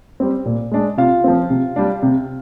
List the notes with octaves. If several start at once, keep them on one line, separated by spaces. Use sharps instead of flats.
G3 C4
A#2
G#3 D4
C3 F4 F5
F3 C4
C3
G3 D4
C3